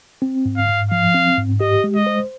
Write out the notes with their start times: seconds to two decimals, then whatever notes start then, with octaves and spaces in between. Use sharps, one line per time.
0.22 C4
0.46 G#2
0.57 F5
0.69 G#2
0.91 F3 F5
1.15 C4
1.38 G#2
1.60 G4 D#5
1.84 G#3
1.95 D#5
2.06 C5